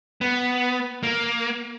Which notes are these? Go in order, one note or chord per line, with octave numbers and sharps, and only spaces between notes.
B3
A#3